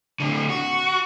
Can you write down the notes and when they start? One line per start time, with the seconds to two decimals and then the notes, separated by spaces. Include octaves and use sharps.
0.20 A2 D3
0.49 F#4